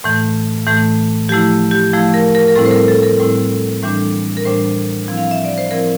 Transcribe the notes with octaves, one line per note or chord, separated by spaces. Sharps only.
A2 E3 A3
A2 E3 A3
F3 A3 E4 G4
G4
F3 A3 E4
A#4
A#4
A#4
A2 G3 C4 E4 A4
C5
A#4
A4
A#4
A2 G3 C4 E4
A2 E3 G3 D4
A#4
A2 E3 G3 D4 C5
F3 C4 E4
F5
E5
D5
C5
F3 C4 E4 A#4